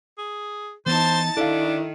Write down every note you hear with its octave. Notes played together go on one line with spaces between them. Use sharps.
G#4
E3 B3 D#4 C5 A5 A6
D#3 D4 E4 A4 F5